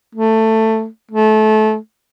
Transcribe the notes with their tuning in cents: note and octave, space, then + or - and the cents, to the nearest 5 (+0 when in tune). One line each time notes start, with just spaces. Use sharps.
A3 +10
A3 -25